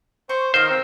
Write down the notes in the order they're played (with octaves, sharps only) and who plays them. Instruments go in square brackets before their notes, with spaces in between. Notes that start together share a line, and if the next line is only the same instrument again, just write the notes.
[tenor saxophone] C5 [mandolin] C#6
[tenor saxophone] D#3 [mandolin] F4 A#4 F5 [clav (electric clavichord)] C5
[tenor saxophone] C4